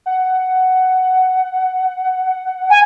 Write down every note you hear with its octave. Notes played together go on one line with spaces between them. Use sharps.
F#5
G#5